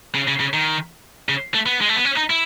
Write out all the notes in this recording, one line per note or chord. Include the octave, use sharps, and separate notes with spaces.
C#3
C#3
C#3
D#3
C#3
A3
B3
G#3
A3
B3
C#4
D#4
E4